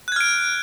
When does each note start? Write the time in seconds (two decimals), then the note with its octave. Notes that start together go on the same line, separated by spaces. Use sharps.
0.08 F#6
0.12 G#6
0.16 F6
0.21 D7